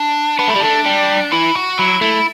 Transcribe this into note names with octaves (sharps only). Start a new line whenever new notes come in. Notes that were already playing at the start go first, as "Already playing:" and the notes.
Already playing: D4
B3 D4
A3 E4
G3
A3 D4
G3
E3 E4
F#4
F#3 E4
A3 E4